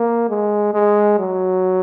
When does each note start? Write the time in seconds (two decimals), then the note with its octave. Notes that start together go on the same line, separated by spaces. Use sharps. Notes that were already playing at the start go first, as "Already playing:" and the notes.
Already playing: A#3
0.30 G#3
0.74 G#3
1.19 F#3